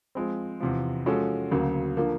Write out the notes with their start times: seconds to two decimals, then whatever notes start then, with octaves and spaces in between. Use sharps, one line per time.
0.15 F3 G#3 C4
0.60 E2 C3 F3
1.06 F3 G#3 C#4 F#4 A4
1.51 D2 C#3 F#3 A#3
1.97 D3 F3 A#3